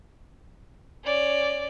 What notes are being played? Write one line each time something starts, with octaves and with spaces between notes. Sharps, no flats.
C#4 D5